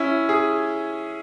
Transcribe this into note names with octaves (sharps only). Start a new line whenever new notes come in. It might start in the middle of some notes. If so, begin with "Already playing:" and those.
Already playing: C#4 E4
G#4